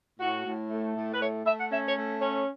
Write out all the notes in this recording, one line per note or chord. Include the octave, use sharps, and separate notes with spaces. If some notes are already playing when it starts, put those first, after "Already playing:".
A2 F#4
A2
A3
A2
B4
A3 C#5
A3 E5
F#5
C#4 E5
C#5
A3
C#4